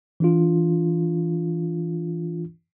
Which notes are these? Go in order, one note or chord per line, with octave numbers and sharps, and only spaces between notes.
E3 D4 F4